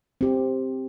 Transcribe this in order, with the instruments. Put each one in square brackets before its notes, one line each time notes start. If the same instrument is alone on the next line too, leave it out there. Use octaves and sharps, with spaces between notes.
[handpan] C4 G4